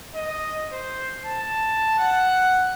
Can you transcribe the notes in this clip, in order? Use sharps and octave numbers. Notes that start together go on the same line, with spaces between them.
D#5
C5
A5
F#5